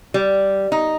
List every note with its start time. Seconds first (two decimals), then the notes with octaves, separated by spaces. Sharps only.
0.14 G3
0.72 D#4